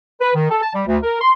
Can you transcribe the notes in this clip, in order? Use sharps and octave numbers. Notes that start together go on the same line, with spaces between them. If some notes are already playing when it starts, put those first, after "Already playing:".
B4
D#3
A4
A5
G3
D2
A#4
C6